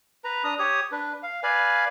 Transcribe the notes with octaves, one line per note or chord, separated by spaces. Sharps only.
B4 A#5
D4 A#5 D#6
G4 C#5 D#6
D4 B4
F5
B4 D5 F5 G#5